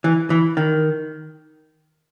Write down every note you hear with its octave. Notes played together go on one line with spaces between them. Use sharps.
E3
E3
D#3